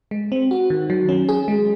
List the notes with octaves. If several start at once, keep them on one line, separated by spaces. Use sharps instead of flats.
G#3
C4
F#4
D#3
F#3
C#4
G#4
G#3